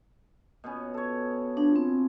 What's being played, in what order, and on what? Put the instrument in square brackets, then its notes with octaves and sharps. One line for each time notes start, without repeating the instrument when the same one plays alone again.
[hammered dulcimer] B2 B3 C#4
A4 C#5
[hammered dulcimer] F3 [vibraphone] D4
[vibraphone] C4